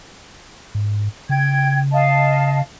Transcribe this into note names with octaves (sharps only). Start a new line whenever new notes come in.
G#2
C#3 G5 G#6
D#5 F5 A5